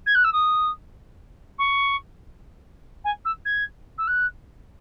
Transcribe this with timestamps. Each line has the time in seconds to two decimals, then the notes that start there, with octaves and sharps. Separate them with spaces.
0.06 G#6
0.14 F#6
0.24 E6
0.32 D#6
1.58 C#6
3.04 G#5
3.25 E6
3.45 G#6
3.98 E6
4.07 F#6